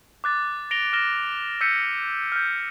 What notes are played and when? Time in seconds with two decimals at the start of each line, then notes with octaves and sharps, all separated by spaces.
0.24 D6 F#6 A6
0.71 A#6 D7 F7 G7
0.93 F6 A#6 E7 G7
1.61 E6 G6 B6 C#7 D#7
2.32 F6 G6